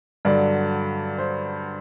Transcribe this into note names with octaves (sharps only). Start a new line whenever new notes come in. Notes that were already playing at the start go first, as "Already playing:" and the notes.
G2 D3 F#3 D5
C5